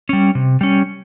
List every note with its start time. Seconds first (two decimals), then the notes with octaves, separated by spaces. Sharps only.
0.09 G3 C#4
0.35 C3
0.61 G3 C#4